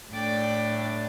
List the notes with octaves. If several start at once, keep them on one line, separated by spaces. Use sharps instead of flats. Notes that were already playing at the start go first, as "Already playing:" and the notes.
A2 A3 D4 D5 G5